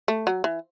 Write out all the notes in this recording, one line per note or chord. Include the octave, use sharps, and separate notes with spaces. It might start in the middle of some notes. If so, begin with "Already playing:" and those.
A3
F#3
E3